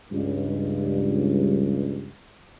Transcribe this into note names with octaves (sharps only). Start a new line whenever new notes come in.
C#2 G2